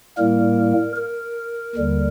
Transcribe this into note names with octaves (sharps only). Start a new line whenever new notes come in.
A2 G3 A#3 A#4
A#4
D#2 D3 G3